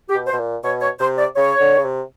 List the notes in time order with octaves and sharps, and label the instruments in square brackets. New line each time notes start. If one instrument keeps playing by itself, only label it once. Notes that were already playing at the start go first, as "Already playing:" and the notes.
[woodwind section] G4
[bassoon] B2
[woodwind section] C5
[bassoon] B2
A#2
[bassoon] B2 [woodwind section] C#5
[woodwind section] C#5
[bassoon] C3 [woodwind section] C5
[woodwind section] D5
[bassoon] C#3 [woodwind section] C#5
[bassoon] D3
C#3
C3